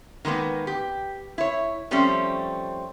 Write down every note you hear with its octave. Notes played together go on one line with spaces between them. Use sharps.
D#3 G#3 A#3 B3
G4
E4 C#5
F3 G3 A3 C4 C#4